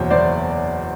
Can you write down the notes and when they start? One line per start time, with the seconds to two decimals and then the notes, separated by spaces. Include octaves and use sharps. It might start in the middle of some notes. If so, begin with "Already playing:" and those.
Already playing: F#1 E2 B2 C5 C#5
0.10 F#1 C5 D5